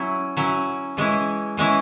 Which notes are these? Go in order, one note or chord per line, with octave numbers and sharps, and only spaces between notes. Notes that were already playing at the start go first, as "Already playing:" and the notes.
Already playing: F#3 C#4 E4
F#3 C#4 E4
E3 G#3 C#4 E4
E3 G#3 C#4 E4